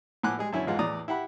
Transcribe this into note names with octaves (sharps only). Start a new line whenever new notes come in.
A2 F3 F#5 G#5 D6 F#6
G3 G#3 G#4
F#2 D3 E4 C#5 G#5
G#1 E2 G#3 F4 F#5
E2 A2 D5 A#5 D#6
E4 G4 F#5 B5